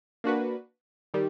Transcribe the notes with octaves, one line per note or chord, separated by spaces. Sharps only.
A#3 D4 F#4 B4
D#3 G3